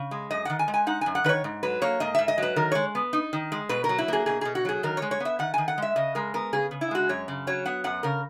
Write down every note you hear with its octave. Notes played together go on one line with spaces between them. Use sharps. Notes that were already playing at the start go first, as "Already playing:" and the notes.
Already playing: C#3
G#3
F#2 D#5
D#3 F#5
G#5
G#3
G#5
D#4 F#5
F#2 G#5
F#5
D#3 B4 C#5
G#2
F#3 B4
A#3 C#5
G#2 D#5
G#2 E5
D#5
F#3 B4
D#3 A#4
G#3 C#5
B3
D#4
D#3
G#3
B2 B4
A#4
F#3
E4
A#3 G#4
B2 G#4
B2 G#4
F#4
F#3 G#4
D#3 A#4
G#3 C#5
C#5
B3 E5
D#3 F#5
D#3 G#5
F#5
G#3 E5
C#3 D#5
G#3 A#4
B3 A#4
C#3 G#4
C#3
E4
G#3 F#4
F#2 C#5
C#3
F#3 C#5
B3 F#5
F#2 F#5
C#3 A#4